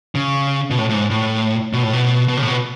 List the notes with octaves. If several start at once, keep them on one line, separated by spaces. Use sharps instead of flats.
C#3
B2
A2
A2
G#2
A2
B2
A2
B2
B2
C#3
A2
B2